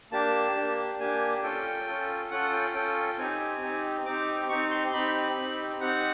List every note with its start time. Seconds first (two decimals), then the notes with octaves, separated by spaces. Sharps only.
0.12 A#3 D4 G4 A5
0.55 A#3 D4 G4
1.00 A#3 D4 G4 G#5
1.43 C#4 F4 A4 G5
1.87 C#4 F4 A4
2.31 C#4 F4 A4 F#5
2.53 G5
2.75 C#4 F4 A4 G5
3.18 C4 D#4 G4 G#5
3.62 C4 D#4 G4
4.06 C4 D#4 G4 D6
4.49 C4 D#4 G4 C#6
4.71 C6
4.93 C4 D#4 G4 B5
5.37 C4 D#4 G4
5.80 C4 D#4 G4 F#5